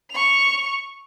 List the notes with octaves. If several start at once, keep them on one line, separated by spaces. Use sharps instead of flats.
C#6 F7